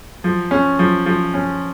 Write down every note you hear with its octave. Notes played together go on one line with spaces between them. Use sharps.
F3
C#4
F3
F3
C#4